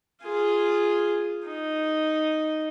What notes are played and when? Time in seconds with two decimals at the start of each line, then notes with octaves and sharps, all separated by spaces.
0.23 F4 G#4
1.47 D#4